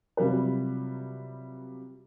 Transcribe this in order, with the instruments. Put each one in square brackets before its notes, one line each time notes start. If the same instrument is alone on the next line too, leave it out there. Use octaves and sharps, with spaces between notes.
[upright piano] C3 F#3 G3 F4 B4